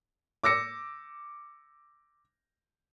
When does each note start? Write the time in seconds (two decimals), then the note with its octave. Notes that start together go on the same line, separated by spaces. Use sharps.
0.44 D6 E6 A#6 C#7